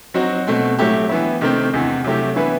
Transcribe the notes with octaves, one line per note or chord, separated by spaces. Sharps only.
F#3 C4 D#4 F#4
B2 A3 C4
A2 F#3 A3 E4 G4
E3 B3 E4
C3 D#3 A3 C4
E2 C3 E3
C3 F#3 A3 E4 G4
E3 B3 E4 B4